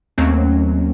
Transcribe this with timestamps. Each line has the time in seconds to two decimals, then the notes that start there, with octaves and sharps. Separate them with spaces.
0.18 D#2 F#3 A3 A#3 C4 C#4